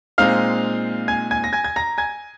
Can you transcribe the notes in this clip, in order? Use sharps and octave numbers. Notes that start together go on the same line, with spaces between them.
A#2 G#3 C4 D#4 F5 F6
G#5 G#6
G#5 G#6
A#6
G#5 G#6
G#6
A#5 A#6
G#5 G#6